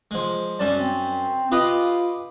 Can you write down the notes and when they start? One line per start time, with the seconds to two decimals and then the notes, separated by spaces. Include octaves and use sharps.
0.11 F3 G#3
0.59 F#2 G3 C#4 A5
0.80 C4
1.52 F4 G4 B4 D#5